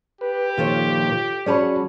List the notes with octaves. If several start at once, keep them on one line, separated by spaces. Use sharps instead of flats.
G4 B4
A#2 D#3 F3 F4 A4 C#5
F#3 C#4 G#4 C#5 D5 A5 B5